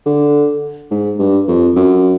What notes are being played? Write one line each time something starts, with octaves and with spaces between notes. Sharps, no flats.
D3
G#2
G2
F2
F#2